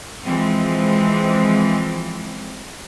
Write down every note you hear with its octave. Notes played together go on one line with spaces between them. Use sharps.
E3 F3 G#3 C4